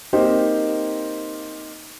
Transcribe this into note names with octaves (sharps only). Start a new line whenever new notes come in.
A#3 C4 D#4 G4 C5